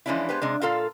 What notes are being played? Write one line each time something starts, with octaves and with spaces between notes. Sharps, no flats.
E3 F3 G#3 C#4 D4 E4
G#3 B3 G4 B4 C5
C3 G#3 D4
A#2 F4 A4 F5